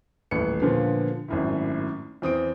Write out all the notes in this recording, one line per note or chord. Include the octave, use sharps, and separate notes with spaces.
D#1 A1 B4 C#7
A#2 D3 F3 B3
G#1 F#2 A2
E2 C4 D#6 D7